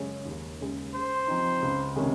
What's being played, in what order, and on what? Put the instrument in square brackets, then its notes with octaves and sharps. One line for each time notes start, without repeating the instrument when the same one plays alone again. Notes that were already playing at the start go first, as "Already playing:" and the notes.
Already playing: [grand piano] F#2 C#3 G#3 C#4
D#2
C#3 G#3
[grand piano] C#3 [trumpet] C5
[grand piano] F3 C4 D#4
C#2
C3 D#3 G#3 C#4